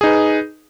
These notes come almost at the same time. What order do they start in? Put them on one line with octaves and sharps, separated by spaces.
G#4 D#4 B4